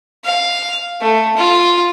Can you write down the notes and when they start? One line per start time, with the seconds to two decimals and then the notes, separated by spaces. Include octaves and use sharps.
0.24 F5
1.01 A3
1.37 F4